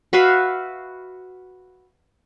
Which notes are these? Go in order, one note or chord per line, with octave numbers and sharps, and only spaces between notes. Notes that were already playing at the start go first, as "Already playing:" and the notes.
F#4 B4 E5 F5